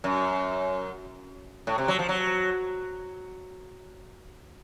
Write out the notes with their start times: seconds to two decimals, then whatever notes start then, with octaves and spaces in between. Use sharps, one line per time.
0.04 F#2
1.67 A2
1.78 C3
1.88 F#3
1.99 F3
2.09 F#3